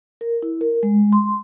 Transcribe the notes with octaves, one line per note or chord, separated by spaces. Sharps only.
A#4
E4
A#4
G#3
C6